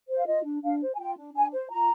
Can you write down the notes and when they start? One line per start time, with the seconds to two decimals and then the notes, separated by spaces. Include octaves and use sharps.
0.09 C5
0.16 F5
0.27 F4 D#5
0.45 D4
0.63 D4 F5
0.80 C5
0.94 G#5
0.98 F4 G5
1.17 D4
1.35 D4 G#5
1.53 C5
1.70 F4 A#5